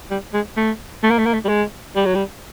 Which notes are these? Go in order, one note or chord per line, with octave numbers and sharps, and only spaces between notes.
G3
G#3
A3
A3
A#3
A3
A#3
A3
G3
G#3
G3
F#3
G3